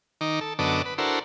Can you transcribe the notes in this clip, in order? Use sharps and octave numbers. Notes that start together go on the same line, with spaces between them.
D#3 D#4 D6
A4
F#2 D3 B3 A4 D#5 D6
B4
D4 E4 F#4 A4 A#4 C5